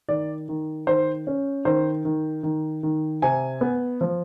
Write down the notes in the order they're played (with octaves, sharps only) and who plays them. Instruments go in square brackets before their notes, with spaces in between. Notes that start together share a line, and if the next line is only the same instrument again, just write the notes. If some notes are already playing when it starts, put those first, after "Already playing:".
[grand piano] D#3 D5
D#3
D#3 C5
C#4
D#3 C5
D#3
D#3
D#3
C3 G#5
B3
F3